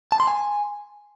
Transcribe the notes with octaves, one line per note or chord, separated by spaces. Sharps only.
A5
C6
G#5